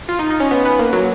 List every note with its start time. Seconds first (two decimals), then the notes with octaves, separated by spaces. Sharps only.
0.09 F4
0.19 D#4
0.30 D#4
0.40 C#4
0.51 B3
0.65 B3
0.79 A#3
0.93 F#3